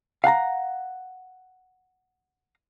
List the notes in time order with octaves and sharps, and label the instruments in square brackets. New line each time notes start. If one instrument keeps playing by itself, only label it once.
[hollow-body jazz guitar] F5 F#5 A5 A#5